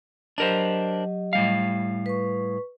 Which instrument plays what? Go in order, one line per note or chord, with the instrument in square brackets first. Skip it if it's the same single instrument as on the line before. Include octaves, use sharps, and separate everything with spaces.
[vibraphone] F#3 G4 D#5 [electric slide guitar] D4 A#4 C5
[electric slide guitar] A2 G3 F5
[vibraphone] B4 C#6